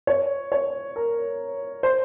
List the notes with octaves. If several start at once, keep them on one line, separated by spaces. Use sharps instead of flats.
C#5
C#5
A#4
C5